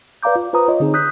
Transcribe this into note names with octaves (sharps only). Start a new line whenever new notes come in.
B4 D5 F5 A#5 D6 G6
F4
F4 B4 C5 A#5 D#6
F4 C#5 D#5
D3 C4 D#4 G#4
D#6 F#6 G6 B6